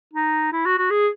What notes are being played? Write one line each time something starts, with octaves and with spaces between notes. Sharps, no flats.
D#4
E4
F#4
F#4
G#4